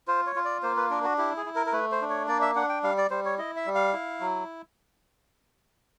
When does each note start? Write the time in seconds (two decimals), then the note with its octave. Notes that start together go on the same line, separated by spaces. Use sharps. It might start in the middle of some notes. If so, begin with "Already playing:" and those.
0.08 F4 C5
0.27 C#5
0.36 F4
0.45 D5
0.63 A#3 C5
0.77 B4
0.90 D4 A#4
1.04 F#4
1.18 E4 G4
1.37 G#4
1.46 E4
1.55 A#4
1.66 A#4
1.73 A3 B4
1.92 C5
2.01 D4
2.10 C#5
2.28 A#3 D5
2.41 E5
2.55 D4 F#5
2.69 G5
2.83 G3 F5
2.97 D5
3.10 G3 C5
3.25 C#5
3.38 E4 D#5
3.56 E5
3.66 G3
3.75 F5
3.93 E4
4.20 F#3